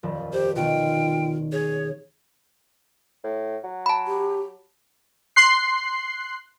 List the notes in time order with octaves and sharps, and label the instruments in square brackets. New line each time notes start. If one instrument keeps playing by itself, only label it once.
[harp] D#1 F2 F3
[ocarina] G4 [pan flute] C5
[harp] B2 D#3 [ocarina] F4 [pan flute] G5
[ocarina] G#4 [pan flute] C#5
[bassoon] A2
F#3
[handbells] A5 B5
[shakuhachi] G4
[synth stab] C6 F#6 C7